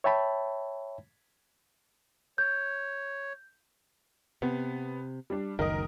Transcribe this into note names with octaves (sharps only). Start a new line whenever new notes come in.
C#5 E5 G5 A5 B5
C#5 G6
C3 B3
G3 D4
F#1 C#2 D#3 A#4 D#5